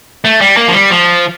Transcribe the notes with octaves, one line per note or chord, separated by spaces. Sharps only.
A3
G3
A#3
F3
G3
F3